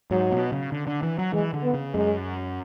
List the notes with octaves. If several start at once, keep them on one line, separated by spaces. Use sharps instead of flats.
G#2 F#3
B2
C#3
D3
D3
E3
F#3
E3 G#3
D3
B3
C#3
F#2 G#3